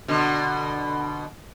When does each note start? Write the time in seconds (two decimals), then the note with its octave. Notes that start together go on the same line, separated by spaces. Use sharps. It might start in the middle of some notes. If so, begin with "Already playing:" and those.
0.08 B2 D3